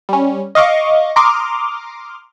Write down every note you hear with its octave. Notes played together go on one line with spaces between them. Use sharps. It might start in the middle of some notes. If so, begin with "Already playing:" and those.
G3 C#4
D#5 F5 C#6 D6
A#5 C6 D6 D#6 F6